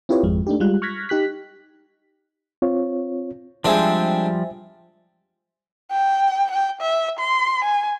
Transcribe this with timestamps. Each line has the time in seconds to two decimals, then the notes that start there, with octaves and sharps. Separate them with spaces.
0.09 C4 E4 F4 G4 B4 C#5
0.23 G#1 F2 G#3
0.47 A3 D4 D#4 G4
0.60 G3 G#3 F4 F#6
0.82 C#6 F6 F#6 G#6 A#6 B6
1.09 D#4 G4 F#6 B6
2.62 C4 F4 C#5
3.64 F3 G3 G#3 C4 D4 C5 E5 G#5
5.91 G5
6.51 G5
6.81 E5
7.20 C6
7.64 G#5